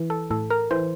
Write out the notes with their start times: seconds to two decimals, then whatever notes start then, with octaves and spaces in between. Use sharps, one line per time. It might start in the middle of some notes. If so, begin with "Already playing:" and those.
Already playing: E3
0.10 A4
0.30 A2 A4
0.50 A#4
0.71 E3 C5